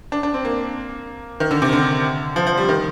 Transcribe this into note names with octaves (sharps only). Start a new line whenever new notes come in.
D4
D4
C4
A#3
D#3
D3
C3
D3
F3
F3
G3
D#3